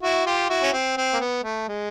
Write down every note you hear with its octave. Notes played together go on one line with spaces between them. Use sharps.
E4 F#4
F4 G4
E4 F#4
C#4
C4
C4
A#3
B3
A3
G#3